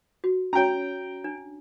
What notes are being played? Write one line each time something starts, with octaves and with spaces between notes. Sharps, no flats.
F#4
C#4 F#4 C#5 G5 A#5
D4